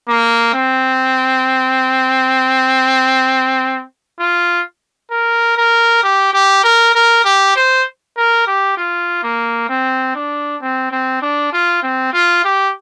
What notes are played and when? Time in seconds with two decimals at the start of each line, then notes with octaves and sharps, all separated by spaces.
0.09 A#3
0.54 C4
4.20 F4
5.11 A#4
5.57 A#4
6.03 G4
6.33 G4
6.64 A#4
6.95 A#4
7.25 G4
7.56 C5
8.17 A#4
8.47 G4
8.77 F4
9.23 A#3
9.69 C4
10.15 D4
10.62 C4
10.91 C4
11.22 D4
11.53 F4
11.83 C4
12.13 F4
12.44 G4